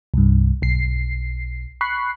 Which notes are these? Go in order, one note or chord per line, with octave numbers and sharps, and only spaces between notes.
C2 G2
B1 C7
B5 C#6 F#6 C7